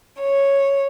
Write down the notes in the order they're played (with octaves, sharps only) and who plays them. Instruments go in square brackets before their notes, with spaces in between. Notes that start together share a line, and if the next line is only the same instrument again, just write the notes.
[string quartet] C#5